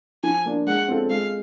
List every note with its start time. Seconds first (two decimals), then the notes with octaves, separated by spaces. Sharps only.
0.23 F3 G#5
0.45 A#3 D4 F4
0.67 G#3 F#5
0.88 C4 F4 A4
1.10 G#3 F5